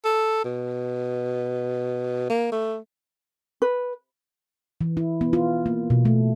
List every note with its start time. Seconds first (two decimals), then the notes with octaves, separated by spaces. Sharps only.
0.04 A4
0.45 B2
2.30 A#3
2.52 A3
3.62 B4
4.81 E3
4.97 E4
5.21 B3
5.33 F4
5.66 A#3
5.90 B2
6.05 A3